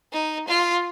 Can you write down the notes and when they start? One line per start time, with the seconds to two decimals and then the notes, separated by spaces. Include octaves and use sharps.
0.13 D#4
0.48 F4